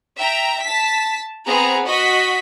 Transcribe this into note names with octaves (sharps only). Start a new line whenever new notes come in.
E5 G5 A#5
A5 B6
B3 C4 G#4 A#5
F#4 D#5 B6